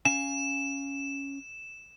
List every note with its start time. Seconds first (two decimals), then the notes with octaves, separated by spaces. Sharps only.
0.05 C#4 F5 G#5 E7